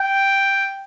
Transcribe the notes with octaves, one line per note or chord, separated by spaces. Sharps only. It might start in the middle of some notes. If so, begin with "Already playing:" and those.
Already playing: G5